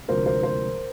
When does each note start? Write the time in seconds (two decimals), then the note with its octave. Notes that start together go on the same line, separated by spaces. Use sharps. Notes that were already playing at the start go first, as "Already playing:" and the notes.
0.08 D2 C3 F3 G#3 A#4 C5
0.26 A#4 C5
0.43 A#4 C5